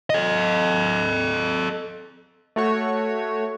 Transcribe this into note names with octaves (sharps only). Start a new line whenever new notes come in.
A4 D#5
A3 F#4 C#5